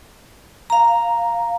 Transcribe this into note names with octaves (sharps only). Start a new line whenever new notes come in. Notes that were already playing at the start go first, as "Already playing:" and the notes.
F5 A#5